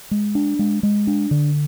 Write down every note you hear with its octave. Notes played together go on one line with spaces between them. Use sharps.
G#3
D4
G#3
G#3
D4
D3